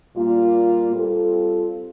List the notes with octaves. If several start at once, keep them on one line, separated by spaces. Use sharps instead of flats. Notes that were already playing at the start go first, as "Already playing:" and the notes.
A#2 G3 A#3 F4
G3 C4 F4 A4